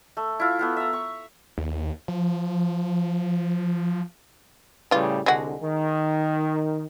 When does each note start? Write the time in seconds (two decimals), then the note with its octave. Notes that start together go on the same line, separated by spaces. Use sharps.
0.17 A3
0.40 E4 F4
0.59 A3 B3 F4
0.77 E5 A#5
0.93 C#6
1.58 D#2
2.08 F3
4.91 A2 C#3 E3 G3 F4
5.26 C2 D3 G#3 F#4
5.62 D#3